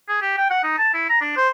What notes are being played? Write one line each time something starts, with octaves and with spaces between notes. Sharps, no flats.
G#4
G4
G5
F#5
D#4
A5
E4
A#5
D4
C5